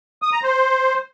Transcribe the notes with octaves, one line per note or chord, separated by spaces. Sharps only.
D#6
A#5
C5